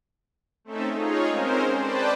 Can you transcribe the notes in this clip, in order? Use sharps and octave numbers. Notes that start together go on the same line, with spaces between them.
A3 C4 C#4 D#4 A4 E5
D#4 F4 G#4 C#5
G#3 C4 C#4 A#4 C5
B4 C5 D5 G5 A5